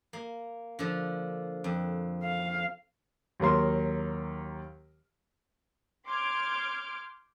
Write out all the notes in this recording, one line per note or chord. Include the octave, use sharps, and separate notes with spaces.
A#3
D3 F3
F2
F5
D#2 F#3 A#4 C6
C6 D6 F6 G6 G#6 D7